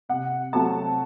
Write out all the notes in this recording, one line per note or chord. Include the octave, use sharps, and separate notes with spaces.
C3 F#5
F#3 A3 C4 A5